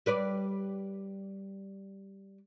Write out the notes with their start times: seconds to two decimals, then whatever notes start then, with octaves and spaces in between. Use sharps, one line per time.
0.06 G3 B4 D5